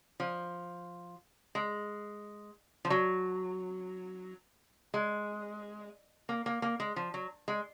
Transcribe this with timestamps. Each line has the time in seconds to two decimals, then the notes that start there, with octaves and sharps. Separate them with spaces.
0.20 F3
1.55 G#3
2.85 F3
2.90 F#3
4.94 G#3
6.29 A#3
6.46 A#3
6.62 A#3
6.80 G#3
6.96 F3
7.14 F#3
7.48 G#3